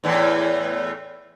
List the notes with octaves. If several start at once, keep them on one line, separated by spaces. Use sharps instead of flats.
E2 A2 E3